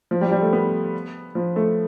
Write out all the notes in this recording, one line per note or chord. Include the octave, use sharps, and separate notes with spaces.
F3
G3
G3
A3
B3
F3
A3